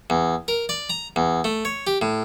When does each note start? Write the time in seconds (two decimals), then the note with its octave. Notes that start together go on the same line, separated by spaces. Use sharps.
0.10 E2
0.48 A#4
0.69 D5
0.90 A#5
1.16 E2
1.44 A3
1.65 C#5
1.87 G4
2.02 A2